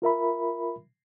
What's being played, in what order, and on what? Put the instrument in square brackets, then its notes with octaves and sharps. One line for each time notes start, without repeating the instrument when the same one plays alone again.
[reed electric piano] F4 A#4 E5 B5